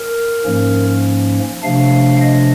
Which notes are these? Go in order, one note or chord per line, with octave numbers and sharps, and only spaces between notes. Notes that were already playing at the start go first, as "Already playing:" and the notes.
Already playing: A#4
G#2 F3 A#3 C#4
C3 F3 A3 D4 F5
D#5